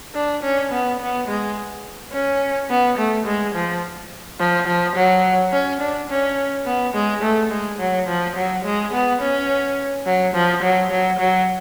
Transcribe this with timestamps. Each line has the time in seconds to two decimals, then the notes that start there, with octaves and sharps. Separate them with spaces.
0.14 D4
0.43 C#4
0.72 B3
1.00 B3
1.28 G#3
2.13 C#4
2.70 B3
2.98 A3
3.26 G#3
3.54 F3
4.39 F3
4.67 F3
4.96 F#3
5.53 C#4
5.81 D4
6.10 C#4
6.66 B3
6.94 G#3
7.23 A3
7.51 G#3
7.79 F#3
8.07 F3
8.36 F#3
8.65 G#3
8.93 B3
9.21 C#4
10.06 F#3
10.34 F3
10.63 F#3
10.90 F#3
11.19 F#3